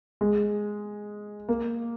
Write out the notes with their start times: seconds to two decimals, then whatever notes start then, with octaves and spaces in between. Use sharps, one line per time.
0.21 G#3
1.49 A#3